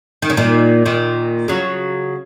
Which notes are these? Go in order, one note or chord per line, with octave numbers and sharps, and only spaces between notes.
D#3
C#3
A#2 D#3
A#2 D#3
C#3 F#3